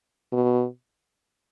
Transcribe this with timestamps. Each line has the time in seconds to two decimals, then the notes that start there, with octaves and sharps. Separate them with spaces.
0.33 B2